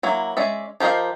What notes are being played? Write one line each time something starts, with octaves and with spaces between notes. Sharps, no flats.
F#3 A#3 E4
G#3 C#4 D5 E5
F3 G4 A#4 D#5 F5